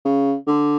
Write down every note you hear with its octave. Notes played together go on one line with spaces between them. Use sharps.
C#3
D3